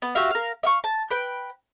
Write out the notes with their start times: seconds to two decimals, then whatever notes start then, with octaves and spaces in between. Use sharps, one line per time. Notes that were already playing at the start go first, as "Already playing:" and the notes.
0.02 B3
0.15 F#4 G4 E5 F5
0.31 A#4 F5
0.63 E5 F5 C#6
0.84 A5
1.11 B4 G5